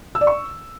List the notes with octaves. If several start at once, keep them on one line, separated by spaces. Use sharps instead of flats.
E6
D5
C#6